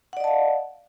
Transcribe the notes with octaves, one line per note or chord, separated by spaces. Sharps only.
D5 D#5 F5 F#5 A5